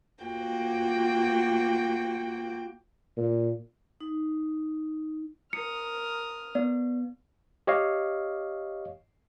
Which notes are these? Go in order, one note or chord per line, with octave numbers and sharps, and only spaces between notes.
A#3 F4 F#4 G5
A#2
D#4
A#4 D#6 F6 C#7
B3 D5
G4 C#5 D#5 F5